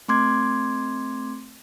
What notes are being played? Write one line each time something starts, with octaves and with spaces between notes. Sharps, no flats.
A3 C4 C6 D6 G#6